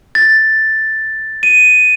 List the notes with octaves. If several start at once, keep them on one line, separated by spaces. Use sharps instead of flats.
A6
D#7